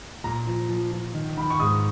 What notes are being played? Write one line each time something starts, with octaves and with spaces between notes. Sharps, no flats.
A#2 A#5
F3
F3
F3
D#3
D#3 B5
C#6
G#2 D#6